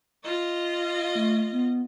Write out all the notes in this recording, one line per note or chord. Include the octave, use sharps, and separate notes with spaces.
F4 D#5
F5
A3
B3